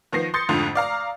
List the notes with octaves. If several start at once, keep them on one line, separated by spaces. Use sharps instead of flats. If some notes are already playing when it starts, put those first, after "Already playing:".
D#3 F3 B3 A#6 C7
C6 D#6 G6 A6 C#7
F2 G#2 D3 F4
D5 F5 A#5